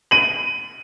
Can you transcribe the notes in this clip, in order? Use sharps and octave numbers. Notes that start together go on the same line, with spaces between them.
D#7 F#7